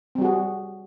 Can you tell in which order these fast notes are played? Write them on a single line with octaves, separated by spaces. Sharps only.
C4 G3 F#4 G#4